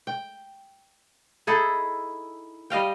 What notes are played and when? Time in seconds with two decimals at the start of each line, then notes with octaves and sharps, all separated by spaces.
0.07 G5
1.47 D#4 E4 G#4 A4
2.70 G3 D#5 F5 G5